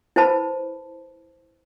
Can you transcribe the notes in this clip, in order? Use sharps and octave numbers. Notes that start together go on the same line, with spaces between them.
E4 B4 C5 A5 B5